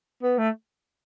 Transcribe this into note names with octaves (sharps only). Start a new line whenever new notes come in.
B3
A3